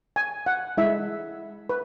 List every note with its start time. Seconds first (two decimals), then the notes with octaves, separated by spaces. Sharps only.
0.16 G#5
0.46 F#5
0.77 G#3 E4 E5
1.69 B4